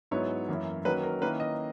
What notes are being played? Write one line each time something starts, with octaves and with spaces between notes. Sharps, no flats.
G#2 F#3 B3 E4 C#5
F#2 E3 A#3 C#4 E4
D#3 F#3 A#3 C#4 B4
A#4
D#3 A#3 C#4 E4 B4
D#5